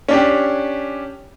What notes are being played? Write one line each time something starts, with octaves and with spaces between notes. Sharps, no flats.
C#4 D4 G4